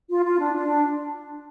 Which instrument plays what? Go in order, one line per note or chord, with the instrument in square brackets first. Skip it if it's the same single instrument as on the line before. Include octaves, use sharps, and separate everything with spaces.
[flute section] F4
F4
D4
D4